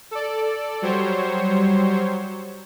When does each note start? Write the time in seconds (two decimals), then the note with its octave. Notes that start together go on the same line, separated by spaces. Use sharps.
0.11 A4 D5
0.82 F#3 G3 C5 C#5